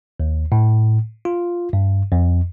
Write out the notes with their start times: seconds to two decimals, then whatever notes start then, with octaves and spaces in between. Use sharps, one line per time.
0.20 D#2
0.52 A2
1.25 F4
1.73 G2
2.12 F2